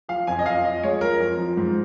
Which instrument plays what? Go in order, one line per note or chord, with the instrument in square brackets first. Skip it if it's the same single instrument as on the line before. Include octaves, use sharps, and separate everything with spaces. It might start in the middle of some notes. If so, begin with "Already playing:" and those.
[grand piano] F3 F5
F2 G#5
D#5
F2 F5
F3 D#5
G#3 C#5
F3 A#4
F2
F3
G#2